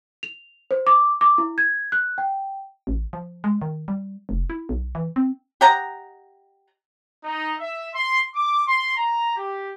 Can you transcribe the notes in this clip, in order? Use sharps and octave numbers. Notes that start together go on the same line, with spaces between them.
F7
C5
D6
D6
E4
G#6
F#6
G5
A1
F3
G#3
D#3
G3
F1
E4
B1
E3
C4
G4 D#5 F#5 A#5
D#4
E5
C6
D6
C6
A#5
G4